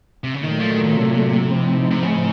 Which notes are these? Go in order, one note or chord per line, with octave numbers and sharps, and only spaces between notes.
C3
C#3
A#2 D#3 F#3 A3
F3
D#3
D#3
C3
A2 F3 C4 D#4
C3
C#3